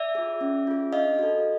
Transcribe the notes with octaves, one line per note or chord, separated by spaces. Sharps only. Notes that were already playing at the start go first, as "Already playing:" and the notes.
Already playing: D5 E5
F4 G#4
C#4
F4 G#4
D4 D#5 F5
F#4 A4